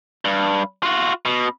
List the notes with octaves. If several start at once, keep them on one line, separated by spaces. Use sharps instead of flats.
G2
F4 F#4
B2